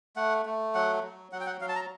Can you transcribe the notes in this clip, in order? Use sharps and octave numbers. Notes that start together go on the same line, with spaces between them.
A3 F#5
A3
F#3 F#5
F#3
F#3 F#5
G5
F#5
F#3 F5
A5
A#5